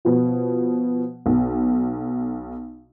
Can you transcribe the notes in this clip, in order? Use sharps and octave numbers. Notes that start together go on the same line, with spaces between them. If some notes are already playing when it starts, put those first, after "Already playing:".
B2 F3
B1